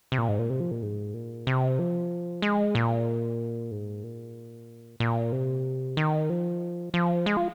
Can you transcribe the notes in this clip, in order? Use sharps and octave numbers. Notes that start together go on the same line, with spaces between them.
C3
A#2
G#2
A#2
C3
F3
A#2
G#2
A#2
C3
F3
G#3
A#2
G#2
A#2
A#2
C3
D#3
F3
F3
G#3
F4